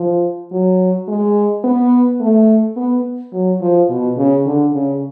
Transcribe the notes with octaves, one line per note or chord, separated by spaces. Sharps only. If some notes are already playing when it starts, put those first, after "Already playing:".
Already playing: F3
F#3
G#3
B3
A3
B3
F#3
F3
B2
C#3
D3
C#3